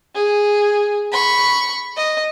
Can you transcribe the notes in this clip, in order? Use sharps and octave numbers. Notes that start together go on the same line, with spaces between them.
G#4
B5 C#6
D#5